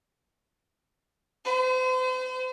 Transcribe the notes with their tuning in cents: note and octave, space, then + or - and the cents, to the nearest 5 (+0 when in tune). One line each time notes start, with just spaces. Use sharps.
C5 -40